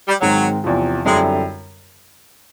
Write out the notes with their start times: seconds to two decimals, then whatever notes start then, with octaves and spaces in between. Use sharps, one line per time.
0.08 G3
0.21 G#2 D#3 F#3 G#3 C4
0.64 E2 C3 F3
1.05 F#2 D3 G3 G#3 C4 E4